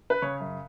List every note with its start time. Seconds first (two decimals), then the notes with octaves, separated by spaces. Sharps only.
0.10 B4
0.22 C#3 C#5
0.40 F#2